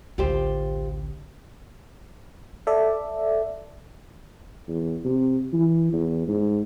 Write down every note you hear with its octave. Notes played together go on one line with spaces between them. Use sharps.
A1 D2 F4 G4 C5
A4 D5 E5
E2
C3
E3
E2
G#2